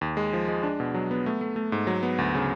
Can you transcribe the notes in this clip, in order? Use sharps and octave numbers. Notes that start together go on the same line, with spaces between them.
D#2
G#3
F3
G#3
D4
B2
F#3
B3
A3
A3
A3
G#2
F#3
B3
D2
C#3